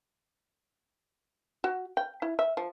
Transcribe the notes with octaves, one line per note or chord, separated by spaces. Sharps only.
F#4
G5
E4
E5
F3